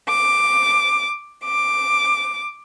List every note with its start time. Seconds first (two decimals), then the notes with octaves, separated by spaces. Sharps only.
0.09 D6
1.44 D6